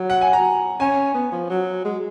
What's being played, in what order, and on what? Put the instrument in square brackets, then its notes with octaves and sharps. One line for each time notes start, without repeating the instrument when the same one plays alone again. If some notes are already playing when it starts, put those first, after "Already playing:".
Already playing: [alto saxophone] F#3
[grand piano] F#5
G#5
A#5
[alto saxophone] C#4 [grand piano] G#5
[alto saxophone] B3
F3
F#3
G#3